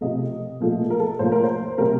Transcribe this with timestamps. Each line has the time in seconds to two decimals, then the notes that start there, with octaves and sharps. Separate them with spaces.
0.01 C3 F3 A3 D#5
0.60 A#2 F3 A3
0.90 A#4
1.00 A4
1.19 A2 F3 A#3 C5
1.32 A#4
1.43 C5
1.78 C3 F#3 A3 A#4